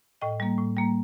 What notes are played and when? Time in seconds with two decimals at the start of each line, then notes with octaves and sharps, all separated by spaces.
0.21 A2 D#5 G5
0.40 G3 A#3
0.58 A2
0.77 G3 A#3